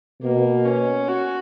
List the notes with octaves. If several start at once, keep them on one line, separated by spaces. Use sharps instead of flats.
B2 A#3
C#4
F#4